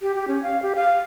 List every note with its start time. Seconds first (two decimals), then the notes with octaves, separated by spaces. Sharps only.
0.02 G4
0.15 G4
0.28 C#4
0.43 F5
0.62 G4
0.75 F5